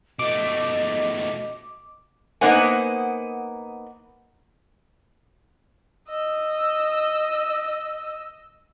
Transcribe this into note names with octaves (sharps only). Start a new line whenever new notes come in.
B2 A3 D#5 D6
A#3 B3 D#4 C5 F#5 G#5
D#5 E6